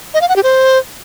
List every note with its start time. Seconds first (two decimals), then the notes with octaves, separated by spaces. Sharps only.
0.14 D#5
0.21 F5
0.29 F#5
0.36 G4
0.43 C5